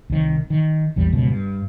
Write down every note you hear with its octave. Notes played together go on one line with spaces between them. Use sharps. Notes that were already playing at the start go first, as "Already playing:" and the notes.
C2 D#3
D#3
A#1 E2 G3
C#2 F#2 B2
G2